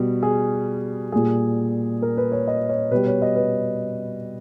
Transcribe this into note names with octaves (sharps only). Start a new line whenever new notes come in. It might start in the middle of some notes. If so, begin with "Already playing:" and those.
Already playing: B2 G3
G#4
A#2 G3 G#4
A#4
B4
C#5
D#5
C#5
B2 G3 B4
C#5
D#5
B4